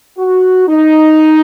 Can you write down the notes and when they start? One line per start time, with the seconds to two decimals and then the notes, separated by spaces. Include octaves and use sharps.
0.18 F#4
0.68 D#4